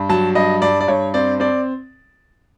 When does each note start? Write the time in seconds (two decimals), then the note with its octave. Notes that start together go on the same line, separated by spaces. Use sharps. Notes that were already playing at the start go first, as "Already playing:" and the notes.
Already playing: G2
0.09 F#3 A5
0.35 G2 D#5
0.62 G2 D5
0.81 D5
0.88 G2 C#5
1.14 C4 D5
1.40 C4 D5